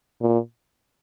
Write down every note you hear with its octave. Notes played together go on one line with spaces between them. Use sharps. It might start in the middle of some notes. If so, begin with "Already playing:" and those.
A#2